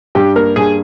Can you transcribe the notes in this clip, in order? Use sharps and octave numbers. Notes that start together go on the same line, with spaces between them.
G2 G4
A#3 A#4
G2 G#4